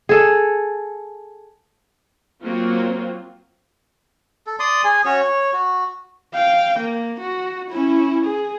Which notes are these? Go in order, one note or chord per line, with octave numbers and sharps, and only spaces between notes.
G#4 A4
F#3 A#3 C4 F4 F#4
A4
D5 C6 D#6
G#4 G#5
C#4 F#4 C#5
C#5
F#4
F5 G5
A#3
F#4
C#4 E4
G#4